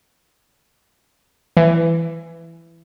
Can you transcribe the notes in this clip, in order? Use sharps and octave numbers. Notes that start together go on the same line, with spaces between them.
E3